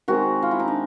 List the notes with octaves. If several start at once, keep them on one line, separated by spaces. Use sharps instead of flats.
D#3 G#3 C4 F#4
F4
E4
D#4
D4